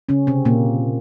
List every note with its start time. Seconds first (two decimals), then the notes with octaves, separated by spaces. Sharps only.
0.09 C#3 C#4
0.27 C3 C4
0.45 A#2 A#3